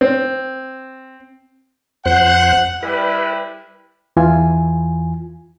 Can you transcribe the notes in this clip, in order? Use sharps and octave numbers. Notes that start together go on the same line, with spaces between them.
C4
F2 C5 F#5 F#6
G3 E4 B4
E2 E3 F4 G#5